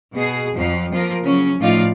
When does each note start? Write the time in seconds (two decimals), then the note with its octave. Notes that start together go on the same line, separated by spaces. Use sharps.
0.13 B2 G#4
0.55 F2 F3 F#3 F5
0.93 F3 A#3 F4 A#4
1.24 C#3 F#3 C#4
1.59 A2 F3 D#4 F4 D5 F5